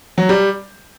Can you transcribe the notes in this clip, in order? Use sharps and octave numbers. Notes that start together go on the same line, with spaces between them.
F#3
G3